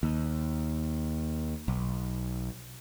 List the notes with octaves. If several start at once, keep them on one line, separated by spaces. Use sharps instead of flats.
D#2
B1